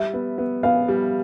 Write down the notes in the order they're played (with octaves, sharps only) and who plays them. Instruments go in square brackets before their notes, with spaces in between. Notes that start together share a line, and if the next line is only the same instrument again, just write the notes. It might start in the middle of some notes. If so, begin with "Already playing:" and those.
Already playing: [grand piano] G3 [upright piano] E5
[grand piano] B3
B3
[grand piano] B3 [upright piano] F5
[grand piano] G3